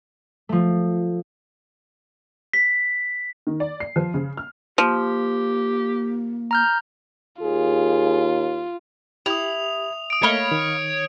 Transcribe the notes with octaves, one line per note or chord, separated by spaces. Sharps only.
F3 A3
B6
D#3
D5
C7
F3
C#3
F6
F3 A#3 G4
A#5 F6 G6
D#2 F4 G#4
E4 G4 D#6 F7
D#6 D7
A3 A#3 C#5 D#5 F5 B5
D#3